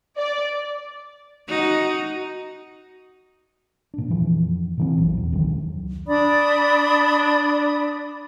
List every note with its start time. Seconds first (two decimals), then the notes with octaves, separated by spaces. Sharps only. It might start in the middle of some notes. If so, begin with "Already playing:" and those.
0.17 D5
1.48 D#4 F#4
3.94 A#2 D4
4.10 F2 E3 F3
4.77 A#2 E3 C4
4.98 A#1 F#3
5.17 E2
5.32 F1 C#2 D#3 F#3
6.07 D4 D5 B5 D#6